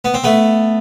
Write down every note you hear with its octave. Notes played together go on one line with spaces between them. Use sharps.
B3
C4
A3 B3